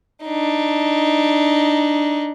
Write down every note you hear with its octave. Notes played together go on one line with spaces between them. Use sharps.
D4 D#4